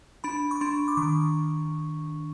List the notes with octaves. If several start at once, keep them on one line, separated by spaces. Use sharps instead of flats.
D4 B5
C#6
D4 C6
D6
D#3 C#6